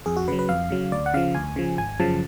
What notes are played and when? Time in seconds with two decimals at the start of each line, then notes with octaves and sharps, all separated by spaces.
0.06 F2 G#4
0.17 F#4
0.28 C#3 F#3 B4
0.39 B4
0.49 F2 F5
0.70 C#3 F#3
0.92 D2 D5
1.06 F#5
1.14 C#3 F3 F5
1.35 D2 G#5
1.56 C#3 F3
1.78 G#1 G#5
2.00 F#2 C#3 F3 A5